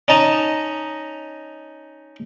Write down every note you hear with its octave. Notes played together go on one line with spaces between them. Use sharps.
C#4 D#4 A5 A#5